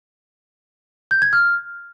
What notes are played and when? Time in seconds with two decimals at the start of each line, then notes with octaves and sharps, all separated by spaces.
1.11 G6
1.22 G#6
1.33 F6